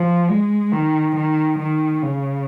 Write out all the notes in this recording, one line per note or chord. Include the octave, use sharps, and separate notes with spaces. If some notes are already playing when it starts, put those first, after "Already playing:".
Already playing: F3
G#3
D#3
D#3
D#3
C#3